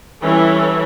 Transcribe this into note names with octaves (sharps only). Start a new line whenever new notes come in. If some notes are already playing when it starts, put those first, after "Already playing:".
E3 G3 C#4 E4 A4